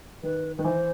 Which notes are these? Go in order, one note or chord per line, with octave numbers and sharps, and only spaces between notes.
D#3 B4
D#3 B4
E3 C5